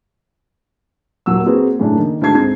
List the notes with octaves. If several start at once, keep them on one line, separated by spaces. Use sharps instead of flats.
D#1 A#2 F#3 A#3 E6
A#3 C4 F#4 G#4 B4
F#2 A2 C#3 A#3 D4
D#3
D2 G#2 F#4 A5 G#6 C7
G#2 C4 G#6